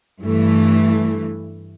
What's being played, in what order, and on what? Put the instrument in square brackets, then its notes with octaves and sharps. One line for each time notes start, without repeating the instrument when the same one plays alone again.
[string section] G2 E3 A3